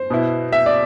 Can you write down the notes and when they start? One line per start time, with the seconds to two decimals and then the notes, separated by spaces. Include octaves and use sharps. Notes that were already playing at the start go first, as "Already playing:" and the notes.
Already playing: C5
0.10 B2 B3 E4
0.52 E5
0.66 D5